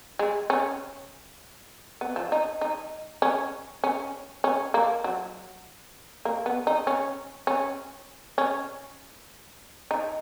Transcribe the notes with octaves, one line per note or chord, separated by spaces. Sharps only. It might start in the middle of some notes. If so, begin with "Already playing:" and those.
G#3
C#4
B3
F3
D#4
D#4
C#4
C#4
C#4
A#3
F#3
A#3
B3
D#4
C#4
C#4
C#4
D#4